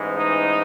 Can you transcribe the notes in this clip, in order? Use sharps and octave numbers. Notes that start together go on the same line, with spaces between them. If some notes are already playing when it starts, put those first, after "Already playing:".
Already playing: A1 G#2 E3
D#4